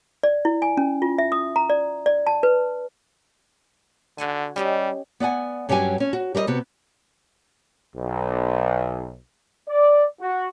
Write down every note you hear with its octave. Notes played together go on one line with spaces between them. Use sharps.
D5
E4
G#5
C#4
F4
E5
D#6
A#5
D5
D5
A5
B4
D3 F#4 F#5 G#5
G3 C#4 G4 D#5
B3 D5 F#5 G#5
G2 F#3 C#4 G4 G5 G#5
C#4
F#4
G3 A#4 C#5 D#5
C3 B3 F#4
B1
D5
F#4